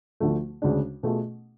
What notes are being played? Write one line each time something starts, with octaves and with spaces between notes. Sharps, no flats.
D2 D3 F3 A3
D2 C#3 G#3 D4
B2 A3 F4 G#4